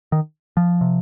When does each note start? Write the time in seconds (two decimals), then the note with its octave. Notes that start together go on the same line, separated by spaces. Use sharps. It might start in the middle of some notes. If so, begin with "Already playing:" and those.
0.12 D#3
0.57 F3
0.81 C3